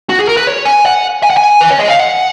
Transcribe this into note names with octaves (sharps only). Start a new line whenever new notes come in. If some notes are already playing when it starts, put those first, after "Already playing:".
F#4
G#4
A#4
B4
C#5
G#5
F#5
G#5
F#5
G#5
B4
C#5
D#5
F5
F#5